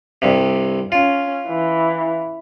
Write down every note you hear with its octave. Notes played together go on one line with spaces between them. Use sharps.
C2 G2 C3
C#4 F4
E3